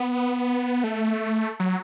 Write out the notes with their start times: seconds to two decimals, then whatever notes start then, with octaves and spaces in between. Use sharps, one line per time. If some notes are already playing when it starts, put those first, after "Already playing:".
Already playing: B3
0.84 A3
1.60 F#3